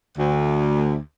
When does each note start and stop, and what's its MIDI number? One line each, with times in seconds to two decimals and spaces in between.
0.18 0.98 38